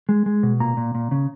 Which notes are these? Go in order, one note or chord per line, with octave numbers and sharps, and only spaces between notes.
G#3
G#3
B2
A#2 A#5
A#2
A#2
C#3